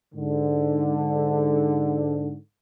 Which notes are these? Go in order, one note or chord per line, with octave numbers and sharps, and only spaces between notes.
G#2 D3